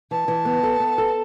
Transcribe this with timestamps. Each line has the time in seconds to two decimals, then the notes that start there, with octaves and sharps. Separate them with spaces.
0.11 E3 A5
0.28 E3
0.45 B3
0.63 A4
0.80 B3
0.98 A4